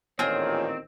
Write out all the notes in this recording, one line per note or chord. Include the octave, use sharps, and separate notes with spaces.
A1 A#2 D#3 C4 F4 G#4 C#5